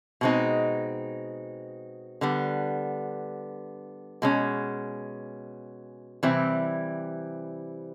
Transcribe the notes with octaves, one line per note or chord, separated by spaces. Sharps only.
B2 G#3 C4 D#4
D3 G3 B3
B2 G#3 C#4
C3 E3 G3 C4 E4